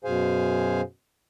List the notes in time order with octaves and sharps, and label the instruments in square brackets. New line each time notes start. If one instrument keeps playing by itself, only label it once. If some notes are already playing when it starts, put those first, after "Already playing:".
[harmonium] F#2 B2 G#4 C5 F5 G#5